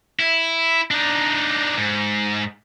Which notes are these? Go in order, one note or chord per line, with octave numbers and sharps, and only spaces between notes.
E4
D4 D#4
G#2